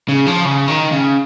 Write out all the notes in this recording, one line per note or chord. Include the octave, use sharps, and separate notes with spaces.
C#3
F3
C#3
D#3
C#3